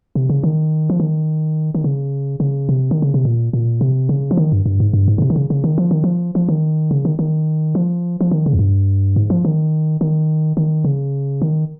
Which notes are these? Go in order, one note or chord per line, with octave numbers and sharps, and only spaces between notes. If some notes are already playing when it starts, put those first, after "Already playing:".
C3
C#3
D#3
F3
D#3
D#3
C#3
C#3
C3
D#3
C#3
C3
A#2
A#2
C3
C#3
F3
D#3
G2
G2
G#2
G2
G#2
C#3
C3
D#3
C#3
C#3
D#3
F3
D#3
F3
F3
D#3
C#3
D#3
D#3
F3
F3
D#3
C#3
F2
G2
G#2
F3
D#3
D#3
D#3
C#3
D#3